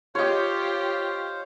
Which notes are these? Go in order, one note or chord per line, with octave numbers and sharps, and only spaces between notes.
F4 G4 C5 C#5 D#5 F5